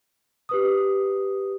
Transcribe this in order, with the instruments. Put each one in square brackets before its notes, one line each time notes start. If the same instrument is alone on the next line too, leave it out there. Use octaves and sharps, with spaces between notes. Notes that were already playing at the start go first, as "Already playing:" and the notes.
[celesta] G4 B4 D#6